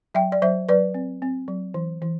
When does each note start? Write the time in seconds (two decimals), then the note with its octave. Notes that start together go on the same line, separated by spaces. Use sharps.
0.15 F#3 E5 G5
0.32 D5
0.42 F#3 C5 E5
0.69 F#3 B4 D5
0.94 C4
1.22 C4
1.48 F#3
1.74 E3
2.02 E3